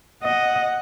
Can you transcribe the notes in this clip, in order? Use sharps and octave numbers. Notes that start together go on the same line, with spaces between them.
D#5 F#5